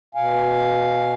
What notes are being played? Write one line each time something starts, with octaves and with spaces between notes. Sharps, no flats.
B2 F5 G#5